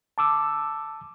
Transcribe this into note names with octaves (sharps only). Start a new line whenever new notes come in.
A5 D6 E6